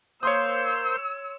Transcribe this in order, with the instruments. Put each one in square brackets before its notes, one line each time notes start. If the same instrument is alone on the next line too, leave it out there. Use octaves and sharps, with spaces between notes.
[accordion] A#3 C5 G6 [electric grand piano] C#5 C6 D#6 [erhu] E6